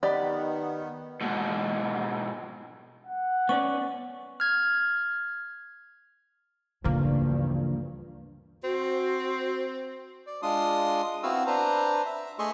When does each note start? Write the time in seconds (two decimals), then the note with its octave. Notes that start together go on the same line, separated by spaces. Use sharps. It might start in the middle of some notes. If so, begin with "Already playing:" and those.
0.03 D#3 B3 G4 D5 D#5 F#5 B5
1.21 G#2 B2
3.07 F#5
3.49 B3 C#4 D5 C#6
4.40 F6 G#6
6.84 D2 G2 C#3 E3 F3 A#3
8.64 C4 F#4
10.26 D5
10.42 G#3 D4 F4 C6 D#6
11.23 B3 C4 E4 F#4 F5 E6
11.47 D4 B4 C5 A#5
12.06 E5
12.39 A3 G#4 D#5 E5 C6 C#6